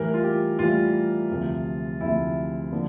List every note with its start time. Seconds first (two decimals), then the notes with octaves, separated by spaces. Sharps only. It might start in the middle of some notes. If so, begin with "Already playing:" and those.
Already playing: A2 E3 G3 A#4
0.14 F4
0.24 G4
0.59 A2 E3 G3 F4
1.31 D2 C3 F3
2.01 D2 C3 F3 E4
2.72 D3 F3